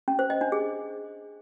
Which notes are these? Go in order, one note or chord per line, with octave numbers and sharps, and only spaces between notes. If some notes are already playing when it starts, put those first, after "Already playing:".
C#4
C5
D#5
D4
G#4